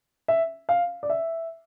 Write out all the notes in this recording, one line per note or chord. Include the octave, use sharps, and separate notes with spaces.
E5
F5
D5
E5